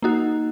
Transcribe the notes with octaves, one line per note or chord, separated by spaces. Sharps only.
A#3 D#4 F#4